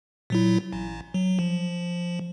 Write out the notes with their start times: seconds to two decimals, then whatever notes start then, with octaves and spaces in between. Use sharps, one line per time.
0.30 A#2 F#3 E4
0.73 A1
1.14 F#3
1.39 F3